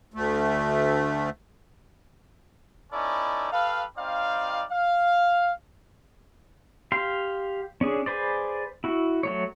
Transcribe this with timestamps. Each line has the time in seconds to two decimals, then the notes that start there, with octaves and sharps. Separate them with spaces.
0.14 D2 A3
2.93 B3 C#4 D#4 E4 A4 D5
3.52 G4 A4 B4 F5
3.98 G3 C4 D#4 D5 F5
4.72 F5
6.92 G4 F5 C6
7.81 C#4 D4 G#4
8.06 G#4 B4 C5 D5
8.84 E4 F#4
9.23 F#3 A3 C#5